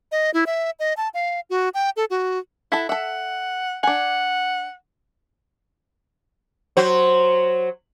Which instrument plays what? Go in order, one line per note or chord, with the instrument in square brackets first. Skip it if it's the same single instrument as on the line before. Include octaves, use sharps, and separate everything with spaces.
[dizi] D#5
E4
E5
D#5
A5
F5
F#4
G5
A4
F#4
[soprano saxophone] E4 [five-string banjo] A4 F#5
[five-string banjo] A4 E5 [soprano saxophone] F#5
[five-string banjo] D4 G#5 [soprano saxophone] F#5
[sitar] F#3 C5